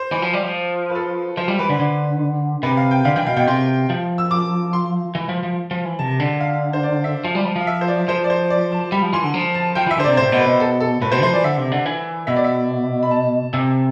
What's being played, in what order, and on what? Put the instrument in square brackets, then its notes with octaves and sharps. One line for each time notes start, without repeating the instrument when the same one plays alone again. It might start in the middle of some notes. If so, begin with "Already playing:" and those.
Already playing: [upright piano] C5
[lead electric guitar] E3
F3
G3
F3
[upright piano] B4
A4
[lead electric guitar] F3 [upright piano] C5
[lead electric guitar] G3
[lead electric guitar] E3 [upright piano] B4
[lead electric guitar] D3
D3
[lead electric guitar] C3 [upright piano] B4
[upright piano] F5
G5
[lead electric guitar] D3 [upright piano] F5
[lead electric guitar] E3 [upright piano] G5
[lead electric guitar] B2 [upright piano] F5
[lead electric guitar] B2 [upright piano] G5
[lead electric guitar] C3 [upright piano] C6
[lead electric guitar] F3
[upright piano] E6
D6
C6
[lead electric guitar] E3
F3
F3
F3
E3
[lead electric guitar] C3 [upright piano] A5
[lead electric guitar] D3 [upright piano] A5
[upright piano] F5
C5
D5
E5
[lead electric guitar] F3
G3
F3
[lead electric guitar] F3 [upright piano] F5
[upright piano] E5
C5
D5
[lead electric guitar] F3 [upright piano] C5
[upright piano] D5
C5
D5
A5
[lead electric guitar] G3 [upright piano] B5
[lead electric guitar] F3
[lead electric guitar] E3 [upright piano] C6
[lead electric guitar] D3
F3
[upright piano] A5
[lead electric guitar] F3 [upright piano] G5
[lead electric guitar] E3 [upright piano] E5
[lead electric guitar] D3 [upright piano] C5
[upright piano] D5
[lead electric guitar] C3
[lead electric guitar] A2 [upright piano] C5
[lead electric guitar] B2
[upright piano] B4
[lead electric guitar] B2
[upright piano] A4
A4
[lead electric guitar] A2 [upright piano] B4
[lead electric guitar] B2 [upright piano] C5
[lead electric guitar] F3 [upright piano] C5
[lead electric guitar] E3 [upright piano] D5
[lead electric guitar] D3 [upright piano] E5
[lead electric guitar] C3
D3
E3
[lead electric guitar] B2 [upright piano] E5
[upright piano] D5
E5
B5
A5
[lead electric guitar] C3 [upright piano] E6